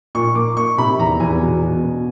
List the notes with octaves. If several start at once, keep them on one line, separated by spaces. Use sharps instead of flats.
A#2 C#6
A#3 D6
A#3 C#6
C3 B5
E2 A#5
E2 G#5
B2
B2
B3